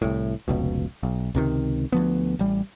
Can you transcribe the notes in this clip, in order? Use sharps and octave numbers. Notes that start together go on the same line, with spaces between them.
C2 A2
F1 C#2 B2
B1
C#2 C3 D#3
D2 F3 B3
A1 G3